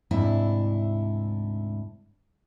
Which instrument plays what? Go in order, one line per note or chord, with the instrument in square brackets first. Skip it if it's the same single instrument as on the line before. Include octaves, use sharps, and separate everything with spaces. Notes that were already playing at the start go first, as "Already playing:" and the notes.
[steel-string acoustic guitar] D2 G#2 C3 D4 E4 E5